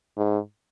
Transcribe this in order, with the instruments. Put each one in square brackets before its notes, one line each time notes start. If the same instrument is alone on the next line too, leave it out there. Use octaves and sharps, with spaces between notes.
[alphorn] G#2